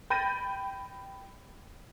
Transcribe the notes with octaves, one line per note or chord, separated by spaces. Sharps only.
G5 B5 G6 A6 A#6 D#7